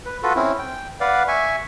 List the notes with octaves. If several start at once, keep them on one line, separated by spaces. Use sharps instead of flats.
B4
F4 F#4 A4 B4
C4 C#4 E4
G5
B4 D5 F5 F#5
E5 G#5 C#6